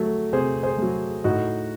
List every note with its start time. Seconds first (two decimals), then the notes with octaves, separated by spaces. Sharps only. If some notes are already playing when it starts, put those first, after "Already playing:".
Already playing: F#3 A3
0.33 C3 G#4 C5
0.63 G#4 C5
0.78 F#3 A3
1.24 A2 D#4 F#4